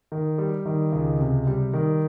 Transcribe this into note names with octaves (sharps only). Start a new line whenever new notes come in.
D#3
G3
D#3
C#2
C3
G3
D#3